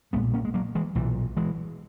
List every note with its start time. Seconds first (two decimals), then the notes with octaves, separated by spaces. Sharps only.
0.13 B1 A#2 G#3 B3
0.34 A#3 C#4
0.45 G#3
0.54 F#3 A#3
0.75 E3 G#3
0.95 B1 A#2 E3
1.37 E3 G#3